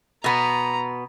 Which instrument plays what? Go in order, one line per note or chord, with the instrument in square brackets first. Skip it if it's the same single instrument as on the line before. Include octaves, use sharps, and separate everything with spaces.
[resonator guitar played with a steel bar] B2 B3 [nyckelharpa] A#5